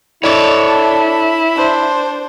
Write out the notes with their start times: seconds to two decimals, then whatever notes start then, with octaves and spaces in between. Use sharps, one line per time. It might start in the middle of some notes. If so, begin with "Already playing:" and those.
0.24 D4 E4 A4 C#5 D5
1.56 D4 C5